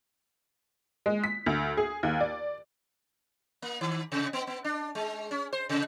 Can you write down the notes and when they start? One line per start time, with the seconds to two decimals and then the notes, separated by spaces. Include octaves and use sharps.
1.06 G#3
1.24 B6
1.46 D2
1.77 G#4
2.03 D#2
2.20 D5
3.62 A#3
3.81 D#3
4.12 C3
4.33 B3
4.47 B3
4.64 D4
4.95 G#3
5.31 C#4
5.53 C5
5.69 C3